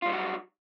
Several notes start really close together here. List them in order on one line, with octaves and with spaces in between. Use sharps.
F4 G3 D#4 F#4 F#3